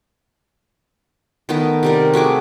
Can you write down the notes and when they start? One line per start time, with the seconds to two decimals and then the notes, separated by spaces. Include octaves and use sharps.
1.49 D#3 A3 B3 A#4
1.83 C3 G3 A#4
2.14 A3 F#4 G#4 D6